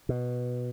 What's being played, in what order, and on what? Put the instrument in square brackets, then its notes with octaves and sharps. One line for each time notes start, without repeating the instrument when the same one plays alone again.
[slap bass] B2